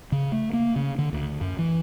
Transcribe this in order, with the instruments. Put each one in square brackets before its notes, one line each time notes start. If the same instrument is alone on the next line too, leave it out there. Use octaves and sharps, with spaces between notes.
[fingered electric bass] C#3
A3
A#3
C#3
D3
D2
F#2
E3